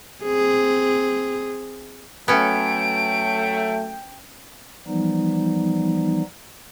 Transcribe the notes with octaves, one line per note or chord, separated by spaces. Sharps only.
C4 G#4
F#3 A3 B3 C#4 G5 D7
E3 F3 G3 B3 D#4